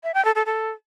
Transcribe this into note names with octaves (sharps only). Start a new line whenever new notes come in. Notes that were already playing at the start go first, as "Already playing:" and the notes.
E5
G5
A4
A4
A4